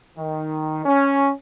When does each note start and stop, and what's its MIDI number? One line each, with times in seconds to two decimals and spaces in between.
0.17 0.84 51
0.85 1.30 61